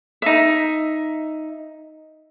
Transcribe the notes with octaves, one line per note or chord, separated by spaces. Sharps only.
D#4 E5